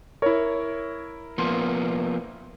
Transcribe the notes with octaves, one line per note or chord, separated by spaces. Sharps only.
E4 A#4 C#5
F3 A#3 B3 C6